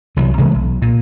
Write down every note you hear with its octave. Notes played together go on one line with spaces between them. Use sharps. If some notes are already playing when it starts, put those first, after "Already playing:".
C2 C3 E3 F#3
C3 E3 G#3 A3
B1
A#2